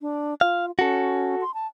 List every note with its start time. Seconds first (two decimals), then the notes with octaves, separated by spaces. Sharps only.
0.01 D4
0.41 F4 F5
0.79 C#4 F#4 A4
1.41 C6
1.54 A5